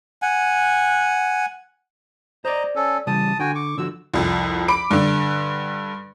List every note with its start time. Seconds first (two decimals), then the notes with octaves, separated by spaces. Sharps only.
0.22 F#5 G#5
2.45 C5 D5 D#5 A#5
2.76 C#4 A4
3.07 C#3 E3 G3 A5 D#6
3.40 D3 F#4 G5 G#5
3.55 C#6 D6
3.78 D3 F3 F#4 E6
4.14 C2 F2
4.68 B5 D6 D7
4.91 G2 D3